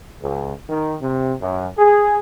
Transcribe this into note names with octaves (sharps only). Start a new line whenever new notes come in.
C#2
D#3
C3
F#2
G#4